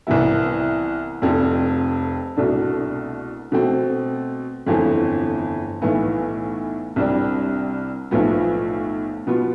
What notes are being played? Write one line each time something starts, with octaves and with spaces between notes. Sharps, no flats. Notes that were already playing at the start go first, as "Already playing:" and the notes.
C2 C3 E3 B3 E4
F1 F2 C3
C2 B2 A3 D4
B2 A3 C4
G1 F2 E3 A3
B1 A2 E3 B3
C2 C3 G3 D4
B1 A2 F3 B3
B2 B3 F4